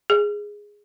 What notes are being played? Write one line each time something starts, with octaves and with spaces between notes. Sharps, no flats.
G#4